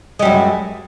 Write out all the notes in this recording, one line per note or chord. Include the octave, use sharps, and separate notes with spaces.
F#2 G3 G#3